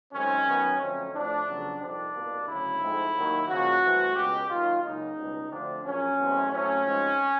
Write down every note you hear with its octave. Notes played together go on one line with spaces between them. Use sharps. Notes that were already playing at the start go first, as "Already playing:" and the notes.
F#2 D#3 G#3 C4 C#4
F#2 D#3 F#3 B3
F2 D3 F#3 A3 C4 C#4
A2 F3 A3 C4 D4
F2 C#3 F#3 B3
F2 C3 D#3 G3 C4 D4
C2 B2 G3 A#3
D2 C#3 F#3 E4
G#2 F3 A3 C4
D#2 D#3 F#3 A#3
C#2 C#3 F3 A#3 F#4
G2 E3 A3 C4
C#2 B2 G#3 G4
D#2 D#3 F#3 F4
C#2 C#3 F#3 A#3 D#4
C#2 B2 G3
D2 D3 F3 A3 C4 D4
A#1 A#2 F#3 C#4
E2 B2 F#3 A3 C4
A2 F#3 A3 C4 C#4
G#2 F3 G#3 C4